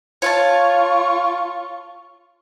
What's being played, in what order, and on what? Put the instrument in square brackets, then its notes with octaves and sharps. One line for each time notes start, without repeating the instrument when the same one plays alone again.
[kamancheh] F4 C#6 [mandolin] C#5 F5 A5